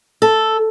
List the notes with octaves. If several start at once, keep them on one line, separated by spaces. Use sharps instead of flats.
A4